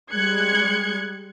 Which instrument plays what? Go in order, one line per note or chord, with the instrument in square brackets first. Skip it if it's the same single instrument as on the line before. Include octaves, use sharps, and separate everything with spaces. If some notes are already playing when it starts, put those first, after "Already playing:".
[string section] G3 G#3 F#6 G#6 C#7